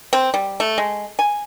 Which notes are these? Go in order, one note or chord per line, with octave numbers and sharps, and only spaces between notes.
C4
G3
A3
G#3
G#5